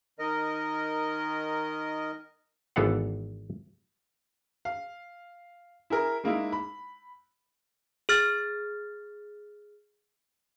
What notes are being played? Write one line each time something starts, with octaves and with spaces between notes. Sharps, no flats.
D#3 A#4 D#5
G#1 E3 B3 A4 F5 F#5
F5
E4 G#4 A#4
G#3 A#3 D#4 E4
B5
G#4 F6 A6